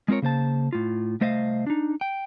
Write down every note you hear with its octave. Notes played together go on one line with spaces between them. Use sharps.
G#3 C4 F4 A#4 C#5
C#3 A#3 C5 A5
A2 F4
C2 A3 C5 D#5 F5
D4 D#4
G5